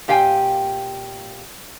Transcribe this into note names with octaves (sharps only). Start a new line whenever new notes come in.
A#2 G4 F5 G5 G#5